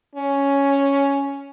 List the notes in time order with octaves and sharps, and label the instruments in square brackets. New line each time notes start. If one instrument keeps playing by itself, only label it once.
[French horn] C#4